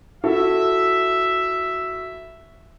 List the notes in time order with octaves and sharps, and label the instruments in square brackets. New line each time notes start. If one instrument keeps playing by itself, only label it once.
[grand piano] E4 F#4 A4 [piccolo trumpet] E5